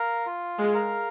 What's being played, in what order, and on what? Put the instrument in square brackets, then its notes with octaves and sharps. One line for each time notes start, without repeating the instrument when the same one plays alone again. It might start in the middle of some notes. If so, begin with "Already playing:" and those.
Already playing: [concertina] A#4 F5
F4
[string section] G#3
[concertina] A#4 F5